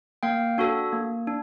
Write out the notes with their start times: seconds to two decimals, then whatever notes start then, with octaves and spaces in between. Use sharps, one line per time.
0.23 A#3 F5 G5
0.58 D4 F#4 A4
0.93 A#3
1.27 D4